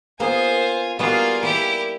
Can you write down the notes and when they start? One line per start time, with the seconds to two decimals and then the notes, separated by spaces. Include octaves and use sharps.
0.20 A#3 B3 F4 G#4 C5 G#5
0.99 G3 A#3 B3 F4 F#4 G#4 F5
1.43 A#3 E4 G4 D5